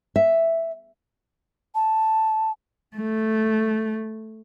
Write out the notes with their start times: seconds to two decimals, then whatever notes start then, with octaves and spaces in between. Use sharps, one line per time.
0.16 E5
1.75 A5
2.97 A3